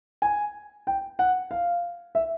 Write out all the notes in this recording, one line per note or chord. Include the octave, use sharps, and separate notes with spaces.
G#5
G5
F#5
F5
E5